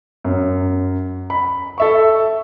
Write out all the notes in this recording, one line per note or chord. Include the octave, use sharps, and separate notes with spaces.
F#2
B5
A4 E5 C#6